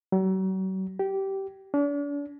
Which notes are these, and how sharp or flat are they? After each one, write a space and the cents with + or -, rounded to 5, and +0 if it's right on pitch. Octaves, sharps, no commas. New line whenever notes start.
F#3 +40
G4 -15
D4 -40